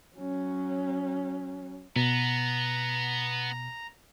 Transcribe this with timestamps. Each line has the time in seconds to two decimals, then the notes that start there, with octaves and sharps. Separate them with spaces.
0.17 F#3 C#4
1.96 B2 B3 A#5